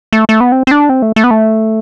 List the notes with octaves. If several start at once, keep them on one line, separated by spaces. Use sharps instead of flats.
A3
A3
B3
C4
C4
D4
C4
A3
A3
B3
A3